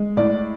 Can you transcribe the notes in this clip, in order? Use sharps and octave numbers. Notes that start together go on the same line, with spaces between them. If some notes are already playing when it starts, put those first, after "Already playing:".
Already playing: G#3
A2 D5